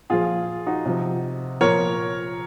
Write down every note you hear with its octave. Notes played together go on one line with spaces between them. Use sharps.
A#2 F3 F4 G#4
D#4 F#4
C3 F3
A#2 F3 A#4 C#5